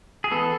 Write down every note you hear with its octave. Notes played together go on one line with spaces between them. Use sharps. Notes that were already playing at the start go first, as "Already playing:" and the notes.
G#4
E3 B3 A4